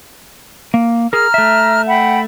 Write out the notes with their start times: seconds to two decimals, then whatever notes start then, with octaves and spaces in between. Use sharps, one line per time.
0.74 A#3
1.13 G#4 A#4 A#5 F6
1.34 A3 E5
1.88 F#5 G5 B5